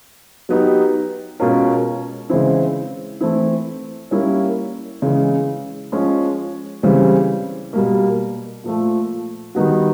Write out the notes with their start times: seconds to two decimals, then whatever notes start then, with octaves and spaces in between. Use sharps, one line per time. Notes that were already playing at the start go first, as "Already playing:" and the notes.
0.49 F#3 B3 D#4 G4
1.40 B2 G#3 C#4 F4 A#4
2.30 C#3 E3 G#3 C4 E4
3.21 E3 A3 C4 E4
4.11 G3 A#3 C#4 E4
5.02 C#3 E3 G#3
5.92 F3 G#3 C#4
6.83 C#3 E3 G3 C4
7.73 B2 G3 A#3
8.64 A#2 F3 A3
9.55 D#3 G3 B3 D#4 F#4